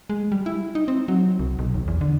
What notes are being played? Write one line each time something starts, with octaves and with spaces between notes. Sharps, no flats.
G#3
G3
E4
D#4
C4
F#3
C2
B1
D#2
E2
D3